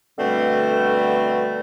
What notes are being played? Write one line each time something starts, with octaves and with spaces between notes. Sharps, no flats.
B2 D3 G3 A3 C4